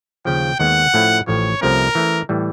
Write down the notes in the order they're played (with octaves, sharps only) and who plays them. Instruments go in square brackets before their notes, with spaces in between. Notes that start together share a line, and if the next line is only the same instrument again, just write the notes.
[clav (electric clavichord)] D#2 C#3 F3 [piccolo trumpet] G5
[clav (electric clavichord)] D#2 D#3 G#3 B3 [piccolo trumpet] F#5
[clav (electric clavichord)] A2 F3 A3 C#4 E4
[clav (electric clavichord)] A1 A2 F3 [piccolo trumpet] C#5
[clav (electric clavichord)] C2 C3 F3 A3 C#4 [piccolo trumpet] A#4
[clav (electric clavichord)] E3 A3 C#4
A2 E3 G3